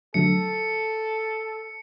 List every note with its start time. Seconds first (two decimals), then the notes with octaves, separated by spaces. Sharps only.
0.14 D3 F#3 A3 A4 C#7